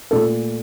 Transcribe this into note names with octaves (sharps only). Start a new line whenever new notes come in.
A#2 A3 A4